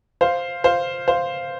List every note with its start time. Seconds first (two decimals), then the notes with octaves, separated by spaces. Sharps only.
0.21 C5 F5
0.64 C5 F5
1.08 C5 F5